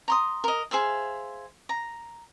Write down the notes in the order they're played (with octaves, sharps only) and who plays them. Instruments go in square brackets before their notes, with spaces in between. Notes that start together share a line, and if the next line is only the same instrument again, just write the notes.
[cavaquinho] A#5 C6 D#6
A#4 D#5
G#4 C5 E5 F5
A#5